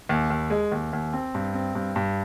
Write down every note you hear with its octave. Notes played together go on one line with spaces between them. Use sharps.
D#2
D#2
G#3
D#2
D#2
C4
G2
C4
G2
G2